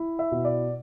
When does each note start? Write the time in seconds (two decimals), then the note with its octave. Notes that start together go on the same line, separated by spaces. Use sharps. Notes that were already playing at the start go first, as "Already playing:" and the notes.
Already playing: E4
0.19 E5
0.32 B2
0.45 D5